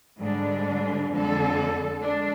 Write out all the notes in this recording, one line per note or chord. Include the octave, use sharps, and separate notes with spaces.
G#2 D3 G3 D4
F2 D3 G#3 A4
G#3 D4